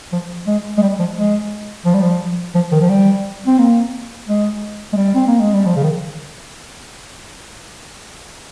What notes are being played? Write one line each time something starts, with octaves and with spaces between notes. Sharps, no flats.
F3
G#3
G#3
G3
F3
G#3
F3
G3
F3
F3
D#3
F3
G3
C4
A#3
G#3
G#3
G3
C4
A#3
G#3
G3
F3
C#3
D#3